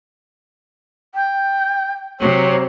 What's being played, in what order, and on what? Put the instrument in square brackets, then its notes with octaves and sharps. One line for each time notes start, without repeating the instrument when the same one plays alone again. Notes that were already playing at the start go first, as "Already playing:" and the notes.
[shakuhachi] G5
[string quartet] C3 F#3 C4 [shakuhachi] C#5